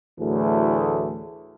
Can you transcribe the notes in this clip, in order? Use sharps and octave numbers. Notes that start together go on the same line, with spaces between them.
D2 A2 E3 F#3 A3 G#4